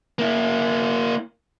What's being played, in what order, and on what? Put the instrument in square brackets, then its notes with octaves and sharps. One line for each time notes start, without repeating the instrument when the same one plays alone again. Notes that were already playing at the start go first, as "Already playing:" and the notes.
[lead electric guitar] A#3 E4